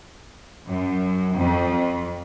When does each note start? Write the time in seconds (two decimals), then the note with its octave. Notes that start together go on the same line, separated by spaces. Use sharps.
0.67 F#2
1.38 F2